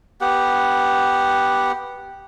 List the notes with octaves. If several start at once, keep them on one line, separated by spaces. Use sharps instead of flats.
B3 G4 F#5